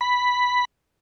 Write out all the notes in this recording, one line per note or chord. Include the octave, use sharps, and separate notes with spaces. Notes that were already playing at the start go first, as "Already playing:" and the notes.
B5